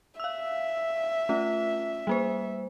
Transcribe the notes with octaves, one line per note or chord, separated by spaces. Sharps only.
E5 F5 E6
A3 C#4 F4
G3 A#3 C5